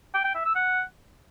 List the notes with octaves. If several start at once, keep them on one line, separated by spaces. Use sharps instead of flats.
G5
G5
E5
E6
F#5